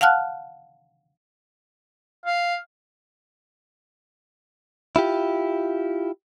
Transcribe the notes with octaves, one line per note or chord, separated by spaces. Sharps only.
F5 F#5 A5 F6 F#6
F5
E4 F4 G4